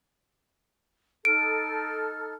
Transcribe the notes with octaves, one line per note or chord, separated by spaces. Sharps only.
D#4 A4 F6 D7